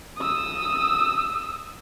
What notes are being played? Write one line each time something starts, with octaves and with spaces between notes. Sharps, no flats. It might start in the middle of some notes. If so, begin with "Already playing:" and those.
D#6 E6